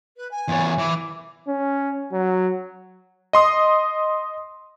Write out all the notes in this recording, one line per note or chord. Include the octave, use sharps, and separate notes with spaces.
B4
G#5
E2 C#5
E3 D6
C#4
F#3
D#5 C6 D#6